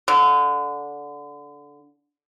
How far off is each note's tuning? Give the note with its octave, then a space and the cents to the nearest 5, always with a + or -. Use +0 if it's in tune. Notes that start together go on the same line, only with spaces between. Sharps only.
D3 -15